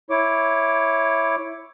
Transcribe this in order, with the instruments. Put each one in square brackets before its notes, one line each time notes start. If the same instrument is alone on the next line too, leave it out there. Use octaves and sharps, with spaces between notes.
[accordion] E4 C#5 D6